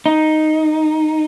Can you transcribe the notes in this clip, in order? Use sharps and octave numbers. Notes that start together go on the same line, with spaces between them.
D#4